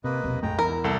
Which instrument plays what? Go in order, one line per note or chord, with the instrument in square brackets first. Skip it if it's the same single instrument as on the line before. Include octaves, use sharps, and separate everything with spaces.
[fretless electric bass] C3 [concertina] A#3 B4 D#5
[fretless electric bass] E1 B1 C3
[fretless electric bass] A#1 F2 A3 [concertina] G#3 G5 A#5
[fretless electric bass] E2 [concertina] E4 [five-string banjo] A#4
[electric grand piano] C2 A4 A5